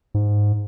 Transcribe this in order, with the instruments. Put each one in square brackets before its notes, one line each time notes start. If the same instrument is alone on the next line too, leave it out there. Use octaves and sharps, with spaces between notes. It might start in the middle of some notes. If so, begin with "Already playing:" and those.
[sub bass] G#2